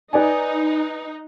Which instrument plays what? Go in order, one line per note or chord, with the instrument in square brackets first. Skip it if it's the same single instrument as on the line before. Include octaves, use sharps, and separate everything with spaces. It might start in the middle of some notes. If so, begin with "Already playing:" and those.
[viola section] D#4 [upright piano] B4 D5 G#5